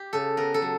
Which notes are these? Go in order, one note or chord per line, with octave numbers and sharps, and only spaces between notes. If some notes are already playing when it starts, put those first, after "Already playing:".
Already playing: G4
C#3 A4
B3 A#4
A4
F#3